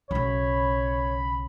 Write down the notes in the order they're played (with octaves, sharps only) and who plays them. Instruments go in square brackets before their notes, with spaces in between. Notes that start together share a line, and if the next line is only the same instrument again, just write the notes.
[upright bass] B1 C#3 [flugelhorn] C#5 [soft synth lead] B5